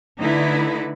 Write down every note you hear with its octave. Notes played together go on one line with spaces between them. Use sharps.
D3 A3 D#4 E4 B4